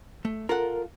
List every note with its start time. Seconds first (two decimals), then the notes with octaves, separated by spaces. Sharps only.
0.25 A3
0.49 F4 A4 A#4 F#5